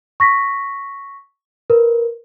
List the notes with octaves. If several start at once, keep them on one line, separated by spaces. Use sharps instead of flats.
C#6 A#6 B6
A#4 B4